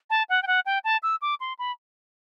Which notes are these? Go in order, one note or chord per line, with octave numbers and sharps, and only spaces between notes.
A5
F#5
G5
F#5
G5
A5
E6
D6
C6
B5